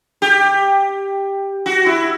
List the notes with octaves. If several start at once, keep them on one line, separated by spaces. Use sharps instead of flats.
G4
F#4
E4